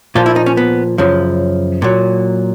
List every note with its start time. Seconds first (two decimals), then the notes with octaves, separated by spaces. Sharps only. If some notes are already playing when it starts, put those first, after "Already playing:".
0.15 A#2 F3 F4
0.26 E4
0.36 D#4
0.46 C#4
0.57 B3
0.98 F#2 C#3 F3
1.82 A#2 F#3